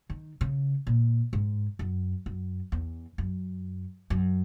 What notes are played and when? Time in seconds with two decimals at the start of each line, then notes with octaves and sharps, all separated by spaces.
0.10 D#3
0.41 C#3
0.87 A#2
1.33 G#2
1.79 F#2
2.26 F#2
2.72 E2
3.18 F#2
4.10 F#2